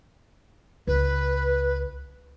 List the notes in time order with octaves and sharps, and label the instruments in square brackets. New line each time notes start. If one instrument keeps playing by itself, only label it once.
[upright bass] C#2 [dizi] B4